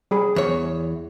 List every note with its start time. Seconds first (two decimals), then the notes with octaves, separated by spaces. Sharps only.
0.11 G3 G#4 B5
0.36 E2 C#5